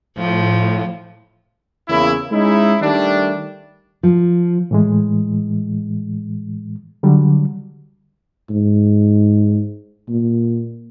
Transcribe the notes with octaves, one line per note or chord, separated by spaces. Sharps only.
A2 F3
E2 C#3 A#3 E4
G#3 C#4 D#4 E4
D#3 G3 A3 D4
F3
A2 E3 G#3
D3 F#3 G3
G#2
A#2